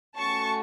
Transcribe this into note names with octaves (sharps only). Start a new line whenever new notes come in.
A3 C#4 F#4 A5 C#6